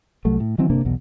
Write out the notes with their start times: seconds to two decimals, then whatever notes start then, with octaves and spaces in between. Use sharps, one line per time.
0.25 C2 F#3 A3
0.40 A2
0.58 D#3 E3 F#3 C4
0.70 G1 C3 A#3 D4
0.85 B1 E2 B2